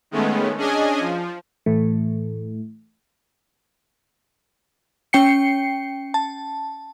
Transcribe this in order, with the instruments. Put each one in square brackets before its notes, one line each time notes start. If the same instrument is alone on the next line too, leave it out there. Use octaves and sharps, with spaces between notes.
[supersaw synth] D#3 G#3 A3 B3 C#4
C#4 D4 G#4 D#5 G#5
F3
[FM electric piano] A2 E3 A3
[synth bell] C#4 G5 C7 C#7
A5